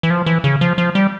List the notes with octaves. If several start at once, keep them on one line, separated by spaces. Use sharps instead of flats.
E3
F3
E3
C#3
F3
F3
G3